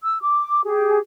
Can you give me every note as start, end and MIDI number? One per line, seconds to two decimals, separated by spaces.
0.03 0.20 88
0.21 0.62 86
0.65 0.98 67
0.65 0.98 68